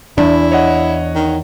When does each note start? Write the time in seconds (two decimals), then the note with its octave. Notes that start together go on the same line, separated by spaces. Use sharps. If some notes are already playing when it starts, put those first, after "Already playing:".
0.18 E2 D4 E4
0.52 C#5 D#5 F#5
1.15 D#3